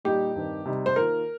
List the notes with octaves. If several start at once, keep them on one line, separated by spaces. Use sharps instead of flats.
A#2 G3 D#4 G4
G2 D#3 C4 D#4
C3 G3 D#4
C5
D#3 A#3 F4 A#4